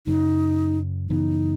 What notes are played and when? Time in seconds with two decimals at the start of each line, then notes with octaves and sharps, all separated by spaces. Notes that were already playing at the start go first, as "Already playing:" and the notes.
0.07 F#2 C#3 F#3 D#4
1.10 F#2 C#3 E3 B3 D#4